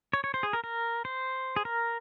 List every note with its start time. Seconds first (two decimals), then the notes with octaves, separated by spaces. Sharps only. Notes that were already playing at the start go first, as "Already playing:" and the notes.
0.13 C#5
0.24 C#5
0.34 C5
0.43 G#4
0.53 A#4
0.64 A#4
1.05 C5
1.56 G#4
1.65 A#4